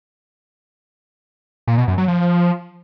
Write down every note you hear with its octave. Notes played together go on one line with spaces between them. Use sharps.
A#2
B2
F#2
F#3
F3